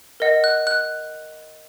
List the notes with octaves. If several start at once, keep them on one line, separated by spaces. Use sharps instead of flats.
A#4 D#5 F#5
F#6
F#6